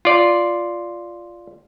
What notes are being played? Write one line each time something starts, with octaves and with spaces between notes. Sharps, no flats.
F4 D5